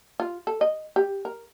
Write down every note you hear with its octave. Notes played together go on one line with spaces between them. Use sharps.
F4
A4
D#5
G4
A#4